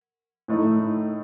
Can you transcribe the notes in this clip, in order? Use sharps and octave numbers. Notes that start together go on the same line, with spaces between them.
A2 A3 D#4